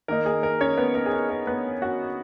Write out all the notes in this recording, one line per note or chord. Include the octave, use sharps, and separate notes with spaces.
D#3 A#3 D#4 A#4
G#4
A#4
C#4 C#5
B3 B4
A#4
G#4
A#4
A#4
B3 B4
F#4 F#5